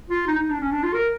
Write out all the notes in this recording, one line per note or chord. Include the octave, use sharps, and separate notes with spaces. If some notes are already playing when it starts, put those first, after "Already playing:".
F4
D#4
D#4
D4
C#4
D4
F4
A#4